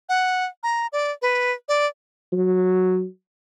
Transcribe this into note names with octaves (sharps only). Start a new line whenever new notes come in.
F#5
A#5
D5
B4
D5
F#3